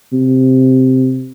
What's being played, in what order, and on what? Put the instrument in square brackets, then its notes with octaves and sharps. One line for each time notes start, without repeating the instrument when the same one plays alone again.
[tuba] C3